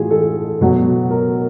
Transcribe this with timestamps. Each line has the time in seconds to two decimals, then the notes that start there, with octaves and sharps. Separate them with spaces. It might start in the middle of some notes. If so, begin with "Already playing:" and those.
Already playing: A2 E3 F4 F#4 G#4
0.11 A4
0.61 B2 F#3
1.10 A#4